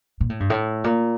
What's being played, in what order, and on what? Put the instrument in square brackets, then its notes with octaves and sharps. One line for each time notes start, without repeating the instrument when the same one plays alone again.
[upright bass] A#2
A2
G2
A2
A#2